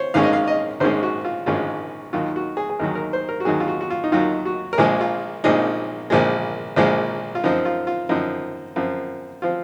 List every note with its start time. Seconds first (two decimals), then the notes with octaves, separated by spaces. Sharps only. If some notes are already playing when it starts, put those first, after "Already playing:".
Already playing: C5 C#5
0.14 A#1 G#2 D#3 G#3 C#4 F5
0.23 D#5
0.33 F5
0.48 D#5
0.80 A#1 G#2 D#3 G#3 C#4 C5
1.03 F#4
1.25 F4
1.46 A#1 G#2 D#3 G#3 C#4 F4
2.13 D#2 D#3 F#3 F4
2.36 F#4
2.57 G#4
2.70 G#4
2.79 D#2 D#3 F#3 A#4
2.95 A#4
3.13 C5
3.29 A#4
3.40 F#4
3.45 D#2 D#3 F#3 G#4
3.60 F4
3.68 F#4
3.81 F#4
3.90 F4
4.04 D#4
4.12 D#2 D#3 F#3 F4
4.45 F#4
4.73 A#4
4.78 A#1 A#2 F3 G#3 G#4
5.01 F4
5.44 A#1 A#2 F3 G#3 D#4
6.10 A#1 A#2 F3 G#3
6.76 A#1 A#2 F3 G#3
7.35 F4
7.44 F#2 F3 C4 D#4
7.65 F4
7.87 F4
8.09 F#2 F3 C4 D#4
8.76 F#2 F3 C4
9.42 F3 C4 F4